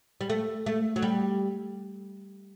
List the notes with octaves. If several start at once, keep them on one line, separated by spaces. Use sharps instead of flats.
G3
A3
A3
F#3
G3